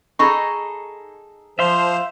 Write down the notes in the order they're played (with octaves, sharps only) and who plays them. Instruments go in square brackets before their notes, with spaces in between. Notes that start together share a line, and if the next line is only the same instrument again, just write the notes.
[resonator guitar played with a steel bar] D#4 G#4 A4 [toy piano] B5 C#6
[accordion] F3 C5 [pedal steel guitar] E5 F5 C6